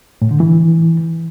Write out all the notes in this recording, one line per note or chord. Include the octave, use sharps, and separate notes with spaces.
A2
D3
E3